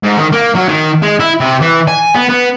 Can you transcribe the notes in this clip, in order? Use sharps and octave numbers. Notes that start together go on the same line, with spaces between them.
G#2
D#3
A#3
F#3
D#3
G#3
E4
C3
E3
G#5
B3
B3